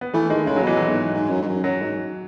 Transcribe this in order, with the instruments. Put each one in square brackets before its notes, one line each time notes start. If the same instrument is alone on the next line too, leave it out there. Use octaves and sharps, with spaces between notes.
[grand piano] B3
[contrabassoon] E3 [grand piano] A3
[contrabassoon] D#3 [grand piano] G#3
[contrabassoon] C#3 [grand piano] G#3
[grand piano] F#3
[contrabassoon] B2 [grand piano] E3
[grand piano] F#3
[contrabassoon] G#2
G#2
F#2
G#2
F#2
[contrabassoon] F#2 [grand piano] F#3
[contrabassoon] G#2